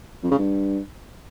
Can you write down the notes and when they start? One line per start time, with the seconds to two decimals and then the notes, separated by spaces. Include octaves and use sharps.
0.23 F2
0.31 C#3
0.38 G2